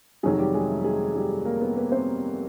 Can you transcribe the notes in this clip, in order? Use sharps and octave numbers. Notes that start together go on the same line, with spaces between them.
F2 C3 D#3 F#3 G#3 G#4
G3 G4
G#3 G#4
A3 A4
G#3 G#4
G3 G4
A#3 A#4
B3 B4
B3 B4
C4 C5